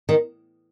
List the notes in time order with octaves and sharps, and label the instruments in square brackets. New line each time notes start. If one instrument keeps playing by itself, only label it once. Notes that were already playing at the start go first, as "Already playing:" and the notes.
[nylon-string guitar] D#3